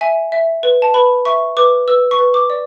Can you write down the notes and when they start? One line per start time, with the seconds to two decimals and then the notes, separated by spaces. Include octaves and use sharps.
0.01 E5 G#5
0.32 E5
0.63 B4
0.82 A5
0.94 B4 B5
1.25 E5 C#6
1.57 B4 D6
1.88 B4 E6
2.11 C#6
2.19 B4
2.34 D6
2.50 D5